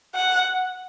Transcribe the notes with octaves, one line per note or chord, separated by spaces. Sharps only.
F#5